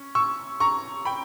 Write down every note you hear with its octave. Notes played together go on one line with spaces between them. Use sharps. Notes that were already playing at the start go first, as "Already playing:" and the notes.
Already playing: C#4
C#6 E6
A#5 C#6
G5 B5